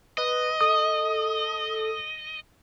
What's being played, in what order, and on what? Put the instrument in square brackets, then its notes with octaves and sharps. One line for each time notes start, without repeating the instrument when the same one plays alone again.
[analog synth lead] B4 [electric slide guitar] D#5
[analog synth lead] A4 [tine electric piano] D#6